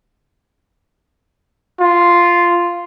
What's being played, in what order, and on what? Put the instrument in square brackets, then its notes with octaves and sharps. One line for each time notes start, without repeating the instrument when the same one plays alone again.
[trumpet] F4